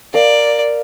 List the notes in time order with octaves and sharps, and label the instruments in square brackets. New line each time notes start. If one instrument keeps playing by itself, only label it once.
[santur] A#4 F5 [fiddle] D5